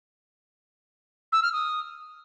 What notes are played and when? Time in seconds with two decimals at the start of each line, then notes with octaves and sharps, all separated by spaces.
1.32 E6
1.43 F6
1.53 D#6